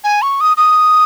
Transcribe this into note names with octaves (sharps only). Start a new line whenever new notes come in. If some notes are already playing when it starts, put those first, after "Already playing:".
G#5
C#6
D#6
D#6